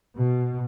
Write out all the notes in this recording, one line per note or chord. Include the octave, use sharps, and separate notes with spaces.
B2